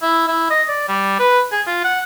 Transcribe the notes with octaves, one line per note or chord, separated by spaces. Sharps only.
E4
E4
D#5
D5
G3
B4
G#4
F4
F#5